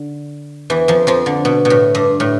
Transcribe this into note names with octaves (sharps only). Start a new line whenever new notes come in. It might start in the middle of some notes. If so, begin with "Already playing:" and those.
Already playing: D3
E2 E3
F2 F3
F2 F3
D3
B2
B2
A2
G2
A2